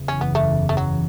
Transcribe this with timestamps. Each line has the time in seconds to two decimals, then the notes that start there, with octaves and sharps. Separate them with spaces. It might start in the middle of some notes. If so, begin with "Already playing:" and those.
Already playing: F#1 E2 C#3 E3
0.08 C#4
0.21 B3
0.35 A3
0.69 A3
0.77 F#3